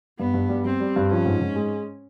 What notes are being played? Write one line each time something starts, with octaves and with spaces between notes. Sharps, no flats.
G2 B3
G2
G3
G3 C4
G3
G2
F3 C#4
G#2
G#2
G#3